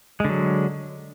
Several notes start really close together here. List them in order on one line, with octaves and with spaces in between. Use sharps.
G#3 D3 F#3